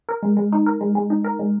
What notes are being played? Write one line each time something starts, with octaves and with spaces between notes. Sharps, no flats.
A#4
G#3
G#3
D#4
A#4
G#3
G#3
D#4
A#4
G#3